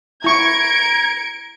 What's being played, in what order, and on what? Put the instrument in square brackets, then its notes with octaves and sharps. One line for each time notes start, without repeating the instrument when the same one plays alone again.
[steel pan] E4 C#6 [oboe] A#5 [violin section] G#6 C#7 D7